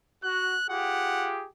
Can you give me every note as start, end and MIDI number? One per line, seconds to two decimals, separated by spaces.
0.24 0.54 66
0.24 0.64 90
0.69 1.45 65
0.69 1.45 67
0.69 1.45 68
0.69 1.33 78